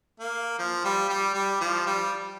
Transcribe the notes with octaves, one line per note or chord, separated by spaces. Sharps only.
A#3
F3
G3
G3
G3
F3
G3